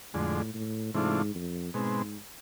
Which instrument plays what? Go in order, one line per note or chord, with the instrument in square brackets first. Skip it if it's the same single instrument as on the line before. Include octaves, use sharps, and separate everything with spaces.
[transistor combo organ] F2 D3 G#3 [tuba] A2
[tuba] A2
[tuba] G#2 [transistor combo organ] C3 E3 A3 D4 F4
[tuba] F2
[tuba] G#2 [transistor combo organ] B2 G#3 C4